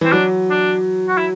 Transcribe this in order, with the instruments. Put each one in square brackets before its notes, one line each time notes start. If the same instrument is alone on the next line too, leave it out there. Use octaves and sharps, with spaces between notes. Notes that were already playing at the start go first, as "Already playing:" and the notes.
[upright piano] E3 [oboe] C4
[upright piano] F#3 [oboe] D4
[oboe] D4
F#4
E4